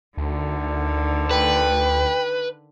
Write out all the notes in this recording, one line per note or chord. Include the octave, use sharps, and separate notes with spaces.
D2 D3 D#3
B4 G5